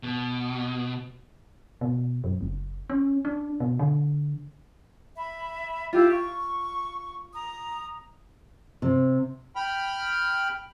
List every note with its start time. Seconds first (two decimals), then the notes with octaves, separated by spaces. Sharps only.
0.03 B2
1.81 B2
2.24 F#2
2.41 F#1
2.90 C#4
3.25 D4
3.60 B2
3.79 D3
5.17 E5 B5
5.93 E4 F4 G4 F5
6.12 C#6
7.33 A#5 D#6
8.82 C3
9.56 G5 B5 F6